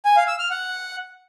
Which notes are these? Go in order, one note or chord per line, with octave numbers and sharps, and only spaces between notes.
G#5
F5
E6
F6
F#5